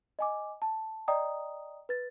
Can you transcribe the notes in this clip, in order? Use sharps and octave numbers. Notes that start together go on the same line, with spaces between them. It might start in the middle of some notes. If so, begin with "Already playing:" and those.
D#5 G#5 D6
A5
D5 D#5 G5 A#5 D#6
B4 A6